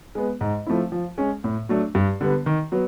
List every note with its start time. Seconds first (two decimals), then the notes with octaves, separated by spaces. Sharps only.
0.15 G#3 B3
0.41 G#2
0.67 F3 A3 C4 E4
0.92 F3
1.18 G#3 C#4
1.44 A2
1.69 F#3 A3 D4
1.95 G2
2.21 D3 G3 B3
2.46 D#3
2.72 F#3 B3